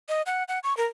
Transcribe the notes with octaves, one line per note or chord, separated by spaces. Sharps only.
D#5
F#5
F#5
C#6
A#4